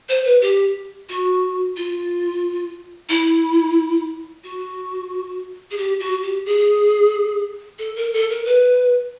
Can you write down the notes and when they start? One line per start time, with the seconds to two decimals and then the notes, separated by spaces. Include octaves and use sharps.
0.09 C5
0.25 B4
0.41 G4
1.09 F#4
1.77 F4
3.09 E4
4.44 F#4
5.71 G#4
5.78 G4
6.00 F#4
6.23 G4
6.46 G#4
7.79 A4
7.96 A#4
8.13 A4
8.30 A#4
8.46 B4